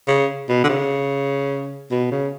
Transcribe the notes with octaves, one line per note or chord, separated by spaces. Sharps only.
C#3
B2
D3
C#3
B2
C#3